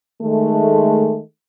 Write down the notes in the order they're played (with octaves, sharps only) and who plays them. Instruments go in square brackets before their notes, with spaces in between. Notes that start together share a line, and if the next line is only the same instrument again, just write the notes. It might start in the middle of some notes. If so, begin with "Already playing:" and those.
[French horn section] D#3 G#3 A3